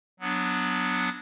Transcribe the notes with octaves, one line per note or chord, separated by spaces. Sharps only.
F#3 B3 D4